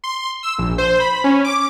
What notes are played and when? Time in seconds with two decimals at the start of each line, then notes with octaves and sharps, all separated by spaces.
0.04 C6
0.43 E6
0.58 A#1
0.78 C5
1.00 B5
1.24 C#4
1.44 D6